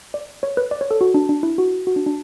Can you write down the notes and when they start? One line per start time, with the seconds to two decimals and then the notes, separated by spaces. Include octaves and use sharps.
0.14 D5
0.43 C#5
0.57 B4
0.71 D5
0.81 C#5
0.91 A4
1.01 F#4
1.14 D4
1.29 D4
1.43 E4
1.58 F#4
1.87 F#4
1.96 D4
2.06 D4